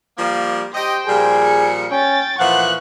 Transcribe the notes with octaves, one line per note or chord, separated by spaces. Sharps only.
F3 G3 A#3
G4 C5 D#5 G5
A#2 F3 G3 G#4
C#7
C#4 G5 A6
A#2 E3 F3 F#5 C#6 F#6